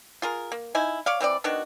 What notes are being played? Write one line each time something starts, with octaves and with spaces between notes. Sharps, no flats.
F4 G#4 A#4
A#3
D#4 E4 G#5
C#5 D5 F5
E3 C4 C#5 D5
B2 D#3 D4 F#4